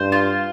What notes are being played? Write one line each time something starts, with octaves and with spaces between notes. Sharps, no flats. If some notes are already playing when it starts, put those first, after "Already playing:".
Already playing: G2 C5
F4